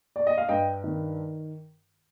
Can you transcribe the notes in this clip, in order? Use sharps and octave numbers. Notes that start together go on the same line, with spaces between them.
D5
D#5
F5
G2 D#5 G5
D#3